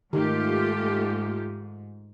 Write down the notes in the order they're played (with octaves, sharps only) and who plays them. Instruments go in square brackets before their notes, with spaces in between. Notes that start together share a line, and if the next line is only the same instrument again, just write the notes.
[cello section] G#2 [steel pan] D#3 [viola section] A3 F4 G4